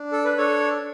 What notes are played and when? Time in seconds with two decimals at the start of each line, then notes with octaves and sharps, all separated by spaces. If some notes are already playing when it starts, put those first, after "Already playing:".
Already playing: D4
0.12 A4
0.25 B4
0.38 D4 A4 C#5